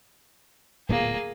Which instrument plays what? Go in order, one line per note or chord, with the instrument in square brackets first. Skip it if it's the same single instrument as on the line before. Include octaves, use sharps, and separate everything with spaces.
[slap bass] D1 A#2 B3 [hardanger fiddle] A#3 G#4